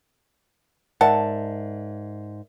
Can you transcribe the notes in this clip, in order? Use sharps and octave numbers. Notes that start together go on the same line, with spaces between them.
G#2 A#4 D5 E5 F#5 A5